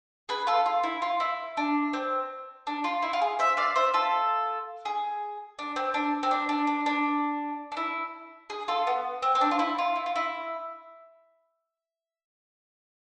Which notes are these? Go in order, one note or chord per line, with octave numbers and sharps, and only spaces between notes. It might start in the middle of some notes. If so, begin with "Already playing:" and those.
G#4 B4
F4 A4
F4
E4
F4
E4
D4
C4
D4
F4
E4
F4
G#4
C5 E5
D5 F5
C5 E5
F4 A4
G#4
D4
C4
D4
C4
D4
D4
D4
D4
D4
E4
G#4
F4 A4
B3
C4
C4
D4
F4
E4
F4
E4
F4
E4